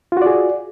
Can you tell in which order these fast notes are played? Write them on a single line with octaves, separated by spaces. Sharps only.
F4 F#4 D5 G#4